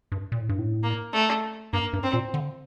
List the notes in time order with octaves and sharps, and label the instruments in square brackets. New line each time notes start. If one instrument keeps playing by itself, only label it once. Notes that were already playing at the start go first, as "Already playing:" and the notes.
[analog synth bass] G2
A#2
A2
G2
A2
[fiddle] A#3
A3
[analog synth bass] G2 [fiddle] A#3
[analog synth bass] G2
[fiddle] C4
[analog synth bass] A#2
D3